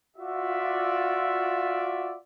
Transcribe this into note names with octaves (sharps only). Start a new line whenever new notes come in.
F4 F#4 D5 E5